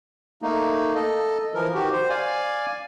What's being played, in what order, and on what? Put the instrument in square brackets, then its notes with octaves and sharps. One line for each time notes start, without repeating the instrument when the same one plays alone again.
[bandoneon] A3 A#3 D#4
A4 D#5
E3 F3 A#4
D#3 F#4 G4
C5
D5 F5 G#5